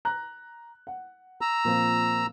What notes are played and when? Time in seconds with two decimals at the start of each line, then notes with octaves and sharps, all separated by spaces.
0.05 A#5 F#6
0.87 F#5
1.41 A#5 E6
1.65 A#2 F3 C4